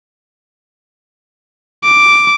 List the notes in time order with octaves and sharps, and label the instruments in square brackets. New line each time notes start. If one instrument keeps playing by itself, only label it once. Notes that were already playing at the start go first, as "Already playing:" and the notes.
[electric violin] D6